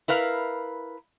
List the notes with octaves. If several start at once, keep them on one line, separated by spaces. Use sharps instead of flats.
E4 A#4 B4 F5